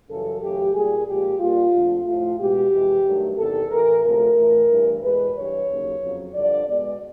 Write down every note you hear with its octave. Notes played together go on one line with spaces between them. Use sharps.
F#2 C#3 E3 G3 A4
F#2 C#3 E3 A3 G4
A#2 G3 G#4
A#2 F3 G#3 G4
A#2 G3 F4
F2 D3 F3 A3
A2 F3 A3 F4
B2 G#3 G4
F2 C3 E3 G#3
G2 D#3 F#3 A3
E2 C3 D#3 A4
A2 E3 A3 A#4
D2 C3 F3 A3 A#4
A2 E3 A3
G2 E3 A3
E2 B2 G#3 B4
G2 E3 G3 C#5
D#2 C#3 F#3
F2 C#3 F#3
G2 D3 F3 D5
B2 G#3 D5